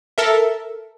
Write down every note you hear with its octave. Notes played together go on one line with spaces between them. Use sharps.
A4 A#4 E5